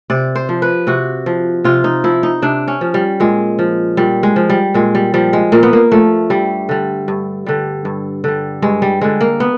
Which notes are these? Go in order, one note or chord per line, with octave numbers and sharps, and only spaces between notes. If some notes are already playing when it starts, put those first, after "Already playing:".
C3 D5
C5
F3
B4
C3 F#4
F3
C3 F4
D#4
F3 E4
D#4
C3 D4
C#4
F3
G3
A#2 G#3
F3
A#2 G3
G#3
F3
G3
A#2 G#3
G3
F3 G3
G#3
A#2 A#3
B3
A#3
F3 A3
G2 G3
D3 G3
G2
D3 G3
G2
D3 G3
G2 G#3
G3
D3 G3 G#3
A#3
B3